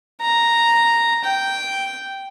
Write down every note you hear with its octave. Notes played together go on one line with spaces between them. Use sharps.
A#5
G5